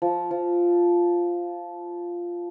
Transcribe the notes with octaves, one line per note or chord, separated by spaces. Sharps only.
F3
F3